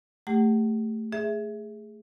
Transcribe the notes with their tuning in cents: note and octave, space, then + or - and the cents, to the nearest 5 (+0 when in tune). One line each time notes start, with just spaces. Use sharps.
A3 +10 G4 +25 F#5 +35
G#4 +0 E5 +0